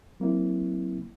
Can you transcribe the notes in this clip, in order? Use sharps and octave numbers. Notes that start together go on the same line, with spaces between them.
F#3 A#3 C4 E4